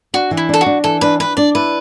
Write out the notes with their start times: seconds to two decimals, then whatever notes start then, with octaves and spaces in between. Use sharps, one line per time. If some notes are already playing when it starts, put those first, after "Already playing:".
0.14 D4 F#4
0.31 E3
0.37 E4
0.49 D4 A4
0.61 F#4
0.66 D4
0.84 E3 A4
1.01 D4 B4
1.20 D4 B4
1.37 D4 D5
1.55 E4 B4